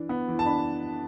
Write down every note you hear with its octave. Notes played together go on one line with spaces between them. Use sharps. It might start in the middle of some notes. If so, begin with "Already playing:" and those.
Already playing: E3 D4
B3
E3
A5
D4 B5